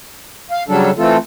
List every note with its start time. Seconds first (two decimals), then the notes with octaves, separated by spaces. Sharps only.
0.51 F5
0.68 C#3 F#3 G3 D4 A4
0.98 E3 A3 C4 F4 A4